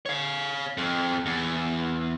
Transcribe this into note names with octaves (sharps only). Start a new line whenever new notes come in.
C#5 F5
F2
E2